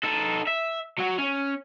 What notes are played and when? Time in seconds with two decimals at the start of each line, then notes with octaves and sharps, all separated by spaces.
0.03 D#4 A4
0.47 E5
0.98 F#3 F#4
1.18 C#4